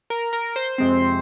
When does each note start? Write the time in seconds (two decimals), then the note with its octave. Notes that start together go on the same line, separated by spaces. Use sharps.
0.10 A#4
0.33 A#4
0.56 C5
0.78 F2 C3 G#3 C4